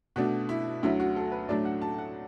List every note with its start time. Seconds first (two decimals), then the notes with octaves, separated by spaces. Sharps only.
0.16 B2 A3 D4 F#4
0.49 E4
0.83 D2 D3 F#3 E4
1.00 F#4
1.16 A4
1.32 B4
1.48 A2 F#3 A3 D4 D5
1.65 F#5
1.82 A5
1.98 F#5